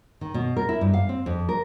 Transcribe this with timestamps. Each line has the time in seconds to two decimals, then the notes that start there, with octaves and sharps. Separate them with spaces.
0.21 D#3
0.34 B2
0.56 A#4
0.69 E4
0.81 G2
0.94 F5
1.09 C4
1.26 F2
1.49 A#4